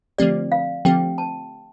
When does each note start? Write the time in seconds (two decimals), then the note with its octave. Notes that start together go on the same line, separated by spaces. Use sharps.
0.18 D3 F3 A3 C4 G4 D5
0.52 F5
0.85 D3 F3 A3 C4 G4 G5
1.18 A5